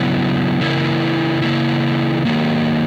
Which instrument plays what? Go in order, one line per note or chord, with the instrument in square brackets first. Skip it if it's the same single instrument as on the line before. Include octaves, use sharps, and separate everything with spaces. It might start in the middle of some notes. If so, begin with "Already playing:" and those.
Already playing: [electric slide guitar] C#3 F#3 B3 E4
C#3 E3 A#3 E4
C#3 E3 A#3 E4
D#3 F#3 A#3